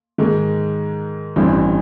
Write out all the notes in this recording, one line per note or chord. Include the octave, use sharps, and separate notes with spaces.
G#2 D#3 G#3
A1 G2 E3 G3 C4